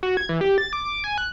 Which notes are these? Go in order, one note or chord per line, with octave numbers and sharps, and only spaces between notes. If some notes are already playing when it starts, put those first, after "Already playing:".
F#4
G#6
E3
G4
A6
D6
D6
G#5
F#6